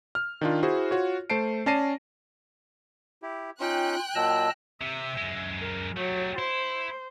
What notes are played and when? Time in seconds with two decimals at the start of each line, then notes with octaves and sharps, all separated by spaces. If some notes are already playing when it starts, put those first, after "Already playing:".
0.15 F6
0.41 D#3 D4 F4
0.63 E4 F#4 G#4 C5
0.91 F4 F#4 C#5
1.30 A3 C5 A5 C7 D7
1.66 C#4 D5 A5 A#6 C7 D#7
3.22 E4 G4
3.60 C#4 D#4 F4 G5 F#6
4.15 A#2 F#3 D#5 A5 E6
4.81 C3 E5
5.17 F#2 G#3
5.58 A#4
5.97 F#3 G3 A3
6.39 E4 C5